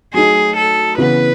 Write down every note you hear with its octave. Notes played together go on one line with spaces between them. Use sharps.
F#3 A3 D#4 G#4
A4
C#3 E3 B3 B4